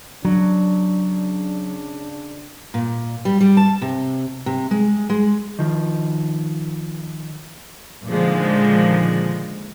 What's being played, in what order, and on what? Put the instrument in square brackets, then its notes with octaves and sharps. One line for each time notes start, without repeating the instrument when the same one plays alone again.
[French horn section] C#3 D4 [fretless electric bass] F#3
[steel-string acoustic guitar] A#2
G3
G3
A5
C3
C3
G#3
G#3
[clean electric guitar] D#3 F3
[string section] A#2 D3 D#3 F3 G#3